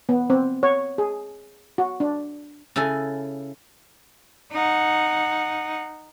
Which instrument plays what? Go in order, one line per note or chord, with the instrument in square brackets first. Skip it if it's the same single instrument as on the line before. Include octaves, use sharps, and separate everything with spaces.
[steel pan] B3
C4
C#5
G#4
F#4
D4
[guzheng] C#3 E4 A4 G#5
[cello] D#4 F#5